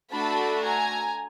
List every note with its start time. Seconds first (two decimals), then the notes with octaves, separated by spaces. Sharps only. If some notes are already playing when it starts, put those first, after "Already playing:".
0.12 A3 D4 F#4 A4 A5 B5
0.63 G#5 A#5